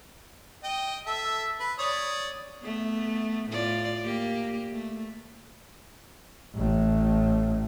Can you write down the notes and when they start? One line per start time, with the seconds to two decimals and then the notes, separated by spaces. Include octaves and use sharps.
0.64 D#5 G5
1.06 A4 E5
1.60 B4
1.79 C#5 D5 D#6
2.63 A3 B3
3.50 A2 F4 D5
4.04 A#3 G4
4.72 A3
6.56 A1 A2